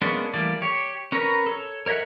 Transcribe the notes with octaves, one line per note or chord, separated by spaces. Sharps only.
G#3 A#3 B3 C#4 D4
E3 G3 A3 A#3 D5
G4 C#5
C#4 A#4 B4 A#5 C#6
A4 C#5
A#4 C#5 D#5 E5 F#5